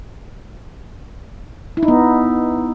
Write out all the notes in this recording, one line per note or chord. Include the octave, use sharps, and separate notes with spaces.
E4
D#4
B3